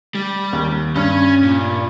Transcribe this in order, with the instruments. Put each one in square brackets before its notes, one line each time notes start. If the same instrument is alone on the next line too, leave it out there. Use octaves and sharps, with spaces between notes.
[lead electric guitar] G3
[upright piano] D#2
[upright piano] G2 [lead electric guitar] C#4
[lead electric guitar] A#2